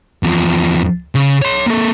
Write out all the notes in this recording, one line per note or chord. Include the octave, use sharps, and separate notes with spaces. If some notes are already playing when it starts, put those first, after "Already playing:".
E2 F3
C#3
C#5 C6
A#3 A4